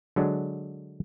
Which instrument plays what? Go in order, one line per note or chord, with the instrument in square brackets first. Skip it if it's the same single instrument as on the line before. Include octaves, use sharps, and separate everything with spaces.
[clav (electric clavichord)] D3 F#3 G#3 D4